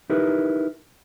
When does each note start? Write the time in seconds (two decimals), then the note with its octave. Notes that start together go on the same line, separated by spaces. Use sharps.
0.10 D#4 E4 G4 A#4 B4